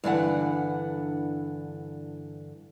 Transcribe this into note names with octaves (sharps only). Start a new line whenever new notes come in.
G2 D3 E3 F#5